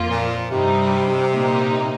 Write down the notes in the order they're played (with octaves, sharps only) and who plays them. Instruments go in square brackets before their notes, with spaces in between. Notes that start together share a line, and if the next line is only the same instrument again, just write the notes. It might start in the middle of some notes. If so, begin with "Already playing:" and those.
Already playing: [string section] F2 F3 A#3 F4
[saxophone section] A#2
[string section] G2 G3 D#4 [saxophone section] C3
[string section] A#2 A#3 D#4